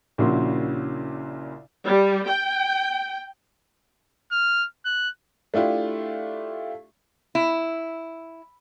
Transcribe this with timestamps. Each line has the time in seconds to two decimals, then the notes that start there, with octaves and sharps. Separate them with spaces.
0.18 A#1 A#2 C#3 E4 F#4 C6
1.86 G3
2.27 G5
4.32 F6
4.85 F#6
5.54 A3 D4 E4 F4 G4
7.35 E4